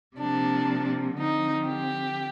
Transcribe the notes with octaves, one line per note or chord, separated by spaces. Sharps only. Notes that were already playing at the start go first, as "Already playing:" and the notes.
C3 F3 A#3 D4
D3 F3 C4 D#4
G4